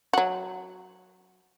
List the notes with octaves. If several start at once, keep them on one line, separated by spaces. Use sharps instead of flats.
F#3 F#4